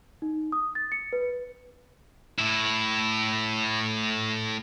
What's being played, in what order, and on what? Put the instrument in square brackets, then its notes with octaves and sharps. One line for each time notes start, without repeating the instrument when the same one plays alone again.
[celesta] D#4
D#6
A6
C#7
B4
[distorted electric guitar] A2 E4